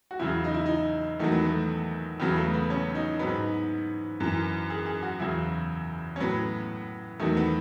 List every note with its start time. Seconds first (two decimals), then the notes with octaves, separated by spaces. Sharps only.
0.11 F#4
0.19 E2 C#3 F#3 E4
0.44 D#4
0.54 E4
0.66 D#4
1.20 E2 D#3 F#3 A3
1.32 B3
1.45 A3
2.20 E2 C#3 F#3 B3
2.36 A3
2.53 B3
2.70 C#4
2.95 D#4
3.19 G#2 F#3 B3
4.20 F#2 E3
4.70 G#4
4.86 G#4
5.03 F#4
5.20 E2 C#3 F#3 E4
6.16 C#4
6.20 A2 F#3 B3
7.20 E2 D#3 F#3 A3
7.37 B3